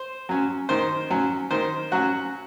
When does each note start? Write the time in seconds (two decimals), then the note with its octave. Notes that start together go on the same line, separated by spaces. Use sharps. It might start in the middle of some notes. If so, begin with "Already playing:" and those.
Already playing: C5
0.29 F#3 C#4
0.69 D#3 C5
1.11 F#3 C#4
1.51 D#3 C5
1.92 F#3 C#4 F#4